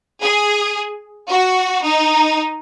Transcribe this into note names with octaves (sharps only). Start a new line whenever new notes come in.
G#4
F#4
D#4